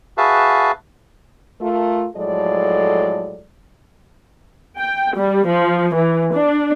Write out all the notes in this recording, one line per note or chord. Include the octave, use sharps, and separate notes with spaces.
F#4 G#4 B4 E5 F5 A5
A3 F4 A#4
A2 F3 F#3 G#3 A4 D5
G5
G3
F3
E3
D4